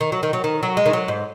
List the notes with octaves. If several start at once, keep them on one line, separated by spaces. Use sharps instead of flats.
D#3
F#3
D#3
F#3
D#3
F#3
G#3
D#3
F#3
G#2